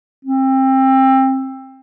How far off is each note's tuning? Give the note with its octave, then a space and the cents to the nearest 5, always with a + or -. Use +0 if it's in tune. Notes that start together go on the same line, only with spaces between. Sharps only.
C4 +25